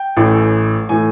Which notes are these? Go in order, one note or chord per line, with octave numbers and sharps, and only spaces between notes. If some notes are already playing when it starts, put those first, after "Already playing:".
Already playing: G5
A1 A2 E3 A3
A2 E3 A3 G#5